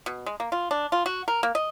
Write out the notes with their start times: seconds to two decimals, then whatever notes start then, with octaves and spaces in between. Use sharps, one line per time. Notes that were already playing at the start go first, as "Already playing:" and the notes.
0.06 B2
0.26 G#3
0.40 A#3
0.52 F4
0.71 D4
0.92 F4
1.06 F#4
1.28 A#4
1.43 A#3
1.55 D#5